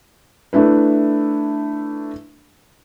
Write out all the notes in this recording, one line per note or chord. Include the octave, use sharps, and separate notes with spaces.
A3 D4 E4 B4